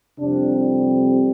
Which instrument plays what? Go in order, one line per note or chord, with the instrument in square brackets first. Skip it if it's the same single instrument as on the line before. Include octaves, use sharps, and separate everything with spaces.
[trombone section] F2 C3 G3 C4 D4